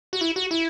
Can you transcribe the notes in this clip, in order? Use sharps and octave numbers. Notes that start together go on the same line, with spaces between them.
F#4
E4
F#4
E4